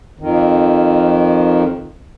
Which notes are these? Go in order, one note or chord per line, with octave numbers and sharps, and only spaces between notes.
F2 D#3